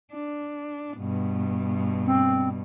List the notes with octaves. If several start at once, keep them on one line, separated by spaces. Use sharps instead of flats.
D4
G2 B2
C4